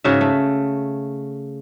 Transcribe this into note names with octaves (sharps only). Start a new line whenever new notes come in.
G#2 C#3 F#4 E5
A3